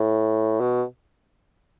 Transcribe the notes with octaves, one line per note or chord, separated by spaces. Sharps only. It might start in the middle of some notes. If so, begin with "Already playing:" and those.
Already playing: A2
B2